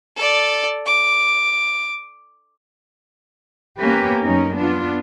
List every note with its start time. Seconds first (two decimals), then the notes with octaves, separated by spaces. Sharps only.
0.17 A4 D5
0.86 D6
3.81 A#3 B3 C#4 G4 B4
4.22 F#2 C#4 D#4 A#4
4.55 B3 D4 F4